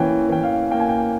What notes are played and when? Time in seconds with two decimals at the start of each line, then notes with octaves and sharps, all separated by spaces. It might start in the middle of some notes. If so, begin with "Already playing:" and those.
Already playing: E3 A#3 C#4 G5 G#5
0.29 E3 G5
0.43 F5
0.71 A#3 G5
0.80 G#5
0.89 G5